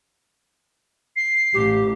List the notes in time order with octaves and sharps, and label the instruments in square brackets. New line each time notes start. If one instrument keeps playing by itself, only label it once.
[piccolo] C7
[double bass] A1 [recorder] G4